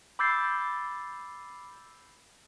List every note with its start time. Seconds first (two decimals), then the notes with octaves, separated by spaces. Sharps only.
0.19 B5 D6 E6 G6 A6 C7